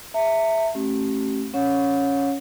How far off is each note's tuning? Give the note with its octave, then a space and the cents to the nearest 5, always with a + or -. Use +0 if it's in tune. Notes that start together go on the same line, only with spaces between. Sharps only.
E5 +0 A#5 -45
A3 +0 C#4 -35 G4 -40
C#4 +0 C#5 +0 F#5 -45